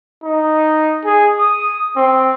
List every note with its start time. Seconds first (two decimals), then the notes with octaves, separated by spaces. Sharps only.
0.24 D#4
1.05 G#4
1.39 D#6
1.96 C4